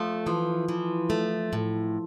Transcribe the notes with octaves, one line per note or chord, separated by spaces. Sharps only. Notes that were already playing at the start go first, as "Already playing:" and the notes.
Already playing: F3 A3
E3 F3
E3
A3
A2